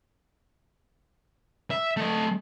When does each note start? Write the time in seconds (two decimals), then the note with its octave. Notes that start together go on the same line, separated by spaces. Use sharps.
1.70 E5
1.97 A3 D#5